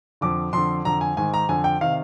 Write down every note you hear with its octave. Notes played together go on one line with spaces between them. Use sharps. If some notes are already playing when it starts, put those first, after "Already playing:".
F2 D3 D6
F2 D3 C6
F2 D3 A#5
G#5
G#2 D#3 G#5
A#5
F2 D3 G#5
G5
C3 D#3 F5